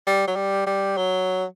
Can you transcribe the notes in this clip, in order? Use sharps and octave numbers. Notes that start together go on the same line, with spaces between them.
G3
F#3
G3
G3
F#3